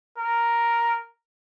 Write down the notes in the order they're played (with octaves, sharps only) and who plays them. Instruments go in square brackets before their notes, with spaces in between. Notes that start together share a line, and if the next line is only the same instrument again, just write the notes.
[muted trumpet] A#4